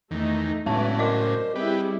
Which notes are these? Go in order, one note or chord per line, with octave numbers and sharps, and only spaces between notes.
E2 D#3 A3 D#4
A2 C#3 F#3 G#3 E4 B4 D5 A5
A#4 C5 D5 D#5 D6
G3 C4 E4 G4 G#4 B4